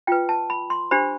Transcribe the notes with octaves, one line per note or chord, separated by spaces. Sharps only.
F4 B4 G5
A5
B5
C6
D4 G4 C5 B5